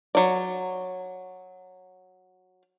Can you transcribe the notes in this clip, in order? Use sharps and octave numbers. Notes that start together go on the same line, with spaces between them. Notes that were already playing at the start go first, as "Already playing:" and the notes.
F#3 D5